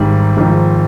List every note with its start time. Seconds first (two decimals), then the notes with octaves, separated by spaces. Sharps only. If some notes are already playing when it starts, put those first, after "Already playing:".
Already playing: G#1 G#2 G3
0.37 G#1 G#2 F3